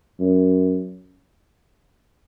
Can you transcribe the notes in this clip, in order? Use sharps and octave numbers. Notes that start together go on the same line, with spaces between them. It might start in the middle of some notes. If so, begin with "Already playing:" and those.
F#2